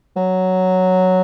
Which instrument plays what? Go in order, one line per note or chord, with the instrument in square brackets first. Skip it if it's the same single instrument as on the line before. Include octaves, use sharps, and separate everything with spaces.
[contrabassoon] F#3